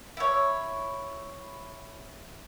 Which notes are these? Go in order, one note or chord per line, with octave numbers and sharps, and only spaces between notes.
E4 C#5